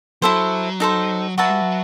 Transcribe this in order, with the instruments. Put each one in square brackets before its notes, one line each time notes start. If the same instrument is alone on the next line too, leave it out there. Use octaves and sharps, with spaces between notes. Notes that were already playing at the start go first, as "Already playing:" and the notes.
[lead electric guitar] F#3 [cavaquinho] E4 A4 C5
[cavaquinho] D#4 A4 C5
[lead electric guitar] F#3 [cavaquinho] F#4 B4 E5 A5
[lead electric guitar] G3
F#3